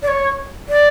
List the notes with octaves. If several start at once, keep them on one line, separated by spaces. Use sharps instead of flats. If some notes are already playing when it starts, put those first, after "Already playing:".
D5
C#5
D5